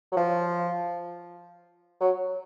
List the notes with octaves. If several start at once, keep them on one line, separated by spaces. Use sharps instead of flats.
F#3
F3
F#3